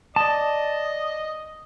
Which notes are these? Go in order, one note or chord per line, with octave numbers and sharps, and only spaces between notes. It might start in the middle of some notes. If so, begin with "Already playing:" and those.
D5 D#5 A5